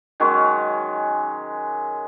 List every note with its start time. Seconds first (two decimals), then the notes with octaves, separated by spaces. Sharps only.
0.20 D#3 F#3 G#3 C#4